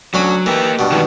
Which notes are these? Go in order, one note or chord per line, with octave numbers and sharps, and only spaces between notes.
D2 F#3 C#4 B5
E3 A#3 G4
G2 B2
D#3 E3 G#3